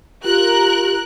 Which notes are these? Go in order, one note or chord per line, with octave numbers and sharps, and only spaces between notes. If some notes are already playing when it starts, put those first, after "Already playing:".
F4 G4 A#4 F#6